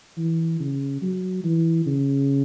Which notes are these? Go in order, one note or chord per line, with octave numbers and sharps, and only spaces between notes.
E3
C#3
F#3
E3
C#3